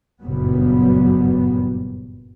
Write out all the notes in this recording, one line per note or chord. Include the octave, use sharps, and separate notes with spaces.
F#1 G2 A#2 F#3 G3 B3